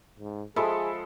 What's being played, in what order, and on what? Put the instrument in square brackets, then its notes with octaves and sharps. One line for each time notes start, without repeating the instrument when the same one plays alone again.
[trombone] G#2
[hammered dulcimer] F3 G#3 [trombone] G#4 [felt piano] A4 B5 [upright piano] E5 G#5 A5